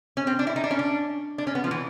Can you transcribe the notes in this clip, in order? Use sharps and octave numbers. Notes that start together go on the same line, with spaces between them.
C#4
C4
D4
E4
D#4
D4
C#4
D4
D4
C#4
B3
F3
E3